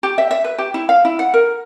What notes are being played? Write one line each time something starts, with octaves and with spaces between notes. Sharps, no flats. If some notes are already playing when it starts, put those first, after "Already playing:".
G4
E5
E5
B4
G4
E4
F5
E4
F#5
A#4